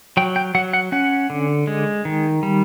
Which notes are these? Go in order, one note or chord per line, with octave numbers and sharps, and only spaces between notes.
F#3 G5
G5
F#3 F#5
F#5
C#4 F#5
D3
G#3
D#3
G3